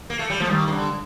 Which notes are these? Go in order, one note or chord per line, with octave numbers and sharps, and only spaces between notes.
A#3
A3
G3
F3 A3
D#3 G3
D#3
D3